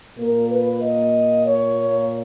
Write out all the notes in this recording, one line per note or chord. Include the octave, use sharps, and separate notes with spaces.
A#2 A#3 A#4
B4
D#5
C#5